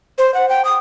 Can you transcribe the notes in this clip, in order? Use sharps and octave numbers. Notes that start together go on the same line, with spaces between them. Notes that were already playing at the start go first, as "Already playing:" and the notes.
C5
F#5
G5
D#6